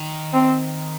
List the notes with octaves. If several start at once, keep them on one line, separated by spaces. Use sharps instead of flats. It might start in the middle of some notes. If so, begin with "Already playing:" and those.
Already playing: D#3
C4